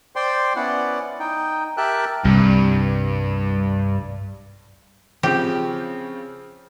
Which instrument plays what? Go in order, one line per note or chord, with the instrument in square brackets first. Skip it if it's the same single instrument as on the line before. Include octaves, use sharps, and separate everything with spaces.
[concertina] C5 D5 G5 C6
B3 C#4 E4 D5 F#5
D#4 G5
G4 A#4 E5 G5 A5 F#6
[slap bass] C2 [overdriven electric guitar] G2
[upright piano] C#3 F3 C4 [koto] G4